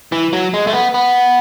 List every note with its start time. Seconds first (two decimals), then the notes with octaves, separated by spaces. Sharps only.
0.12 E3
0.33 F#3
0.54 G#3
0.67 A3
0.73 B3
0.94 B3